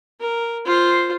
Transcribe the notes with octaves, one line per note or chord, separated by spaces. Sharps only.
A#4
F4 C5